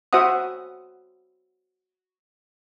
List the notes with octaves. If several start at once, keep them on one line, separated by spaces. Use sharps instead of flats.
F#4 C5 E5 F#5 D#6